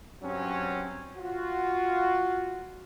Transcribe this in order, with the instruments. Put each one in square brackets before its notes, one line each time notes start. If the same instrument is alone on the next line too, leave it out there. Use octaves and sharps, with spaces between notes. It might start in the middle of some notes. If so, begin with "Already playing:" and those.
[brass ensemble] G2 F#3 C4 C#4
F4 F#4